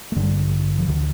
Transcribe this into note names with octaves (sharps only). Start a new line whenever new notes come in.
A3
A1 G2 D3 G3
F3
D2 D3 D#3